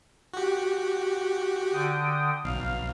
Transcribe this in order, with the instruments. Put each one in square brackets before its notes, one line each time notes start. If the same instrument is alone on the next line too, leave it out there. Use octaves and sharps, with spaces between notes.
[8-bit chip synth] F#4 G4
[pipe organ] D3 G5 D#6
[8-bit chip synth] B1 [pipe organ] F5